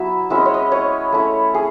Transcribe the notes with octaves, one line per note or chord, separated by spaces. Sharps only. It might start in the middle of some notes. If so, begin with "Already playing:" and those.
Already playing: F#3 B3 E4 E5
G#3 C#4 E4 E5
D#5
C#5
D#5
C#5
A3 C#4 E4
G#4